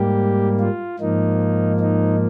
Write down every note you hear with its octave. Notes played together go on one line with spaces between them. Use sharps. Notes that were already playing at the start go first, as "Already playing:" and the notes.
Already playing: G#2 G3 A#3 G4
F4
G#2 F3 A#3 D#4
D#4